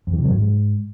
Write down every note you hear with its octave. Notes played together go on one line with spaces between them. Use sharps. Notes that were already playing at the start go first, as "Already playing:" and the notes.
F2
E3
C3
F#3
G#2